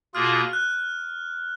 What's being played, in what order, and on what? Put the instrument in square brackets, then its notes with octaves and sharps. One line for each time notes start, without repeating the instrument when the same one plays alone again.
[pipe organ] B2 A#3 F4 G#4 [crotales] F6
[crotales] F#6